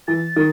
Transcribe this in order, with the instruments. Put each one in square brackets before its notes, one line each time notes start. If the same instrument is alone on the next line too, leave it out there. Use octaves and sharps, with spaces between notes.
[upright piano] E3 [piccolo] A6
[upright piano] D#3